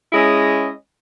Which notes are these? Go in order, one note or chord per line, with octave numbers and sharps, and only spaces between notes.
G#3 C#4 E4 D#5